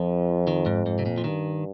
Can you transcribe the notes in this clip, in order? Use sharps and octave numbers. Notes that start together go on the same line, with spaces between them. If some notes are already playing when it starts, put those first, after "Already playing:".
Already playing: F2 F3
D#3
G#2
G#2
C3
A#2
F3
G2 D#3